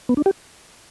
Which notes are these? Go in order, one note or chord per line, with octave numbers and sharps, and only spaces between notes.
B3
D4
G4